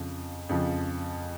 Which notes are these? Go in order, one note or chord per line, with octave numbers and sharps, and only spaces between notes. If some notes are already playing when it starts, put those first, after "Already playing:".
Already playing: F2 C#3 F3
F2 C#3 F3